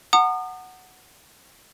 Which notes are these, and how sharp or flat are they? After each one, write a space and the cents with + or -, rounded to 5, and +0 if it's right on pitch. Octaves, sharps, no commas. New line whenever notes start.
F#5 +0 A#5 -45 D#6 -35